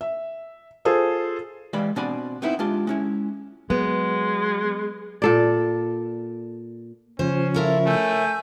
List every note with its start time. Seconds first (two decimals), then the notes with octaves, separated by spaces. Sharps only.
0.01 E5
0.85 F4 G#4 A4 C5
1.73 E3 G3 G#3 D5 F5 B5
1.96 B2 C4 D4 D5 G#5 B5
2.42 B3 C4 D#4 E4 B4
2.59 G#3 D4 F4 G4
2.87 G#3 C#4 E4
3.70 F#3 G#3 B3
5.22 A#2 A4 D5
7.19 C#3 F3 C#4 C5
7.54 E4 F4 A4 A#4 C#5
7.86 A3 G#5 E6 G6